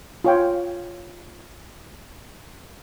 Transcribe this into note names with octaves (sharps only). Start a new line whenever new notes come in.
F4 C#5 G5